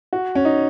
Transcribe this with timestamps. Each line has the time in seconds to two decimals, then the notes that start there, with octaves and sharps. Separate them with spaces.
0.13 F#4
0.35 C#4
0.45 D#4